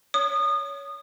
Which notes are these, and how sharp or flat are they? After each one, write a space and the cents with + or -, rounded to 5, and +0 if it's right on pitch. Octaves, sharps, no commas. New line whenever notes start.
C#5 +20 D#6 -25